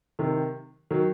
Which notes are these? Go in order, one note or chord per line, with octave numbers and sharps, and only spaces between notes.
C3 D#3
D#3 F#3